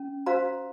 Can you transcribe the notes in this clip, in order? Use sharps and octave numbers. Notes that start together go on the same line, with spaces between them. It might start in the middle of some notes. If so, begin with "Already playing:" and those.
Already playing: C#4
F#4 C5 F5 A#5